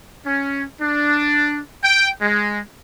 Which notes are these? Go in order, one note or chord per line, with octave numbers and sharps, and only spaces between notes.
C#4
D4
G5
G#3